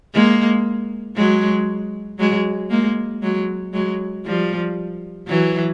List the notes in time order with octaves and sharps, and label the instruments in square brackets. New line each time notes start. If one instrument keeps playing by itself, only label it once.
[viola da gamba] G#3 A#3
F#3 G#3
F#3 G#3
G#3 A#3
F#3 G#3
F#3 G#3
F3 G3
E3 F#3